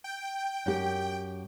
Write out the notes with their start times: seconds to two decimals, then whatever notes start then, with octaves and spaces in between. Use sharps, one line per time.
0.04 G5
0.66 F#2 G4